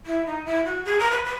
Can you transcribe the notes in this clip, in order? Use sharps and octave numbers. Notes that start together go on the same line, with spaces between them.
E4
D#4
E4
F#4
G#4
A#4
B4
B4